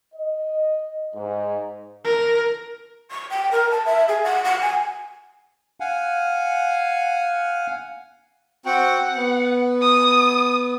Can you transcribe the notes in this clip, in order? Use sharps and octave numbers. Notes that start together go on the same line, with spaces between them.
D#5
G#2
A#4
C#6
G5
A#4
A5
E5
G#4
F#5
F#5
G#5
F5 F#5 G#5
C4 F#4 F#5 G5
B3
D#6